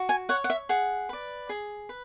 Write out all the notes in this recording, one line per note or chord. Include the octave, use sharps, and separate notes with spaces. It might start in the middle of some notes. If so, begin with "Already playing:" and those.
Already playing: F#4
G#5
C#5 F#5
F#5
E5
G#4 F#5
B4 D5
G#4
B4